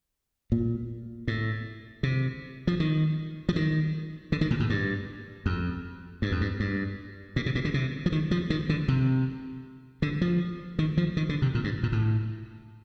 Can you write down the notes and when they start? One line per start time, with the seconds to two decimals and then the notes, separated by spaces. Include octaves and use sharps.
0.52 A#2
1.28 A2
2.03 C3
2.67 F3
2.80 D#3
3.49 F3
3.56 D#3
4.32 D3
4.41 D#3
4.51 A#2
4.60 A2
4.70 G2
5.46 F2
6.22 G2
6.32 F2
6.41 G2
6.60 G2
7.36 A#2
7.46 C3
7.55 A#2
7.65 D3
7.74 C3
8.06 F3
8.12 D#3
8.31 F3
8.50 D#3
8.69 D3
8.88 C3
10.02 D3
10.21 F3
10.79 D#3
10.97 F3
11.17 D#3
11.29 D3
11.42 C3
11.55 A#2
11.64 G2
11.83 A#2
11.92 A2